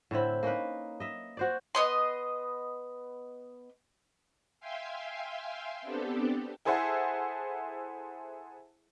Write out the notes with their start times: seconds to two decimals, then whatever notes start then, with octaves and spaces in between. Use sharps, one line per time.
0.11 A2 D3 C4 E4
0.43 A#3 C#4 D#4 B4
1.00 D#5 E5
1.37 F#4 C5 D5
1.75 B3 D#5 C6
4.60 E5 F5 G5 G#5 C6
5.82 B3 C4 D4 G4 A4
6.65 E4 G#4 A4 C5 E5 F#5